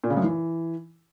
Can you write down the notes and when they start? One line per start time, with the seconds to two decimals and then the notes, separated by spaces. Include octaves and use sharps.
0.04 A#2
0.10 C#3
0.17 F#2
0.23 E3